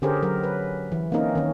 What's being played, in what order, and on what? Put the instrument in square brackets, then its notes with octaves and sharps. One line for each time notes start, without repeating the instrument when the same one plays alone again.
[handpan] D3 C#4 G4 G#4 A#4 C5
F#3 A#4
B4
E3
A#3 C4 C#4 D#4 A#4
D#3 C#4